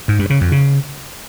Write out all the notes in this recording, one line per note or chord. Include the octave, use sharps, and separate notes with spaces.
G#2
G2
C#3
F2
C#3